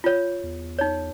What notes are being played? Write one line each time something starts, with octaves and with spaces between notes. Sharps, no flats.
F4 C#5
E2
D#4 C#5